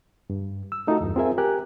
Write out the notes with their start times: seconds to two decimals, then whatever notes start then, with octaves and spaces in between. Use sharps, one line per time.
0.30 G2
0.72 E6
0.87 A3 D#4 F4 F#4 A4
1.01 E2 G2
1.16 C4 F4 G#4 A#4 E5 G#5
1.38 G4 A#4 G#5 F#6